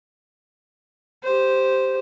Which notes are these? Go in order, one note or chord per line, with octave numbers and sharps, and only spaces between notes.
G4 C5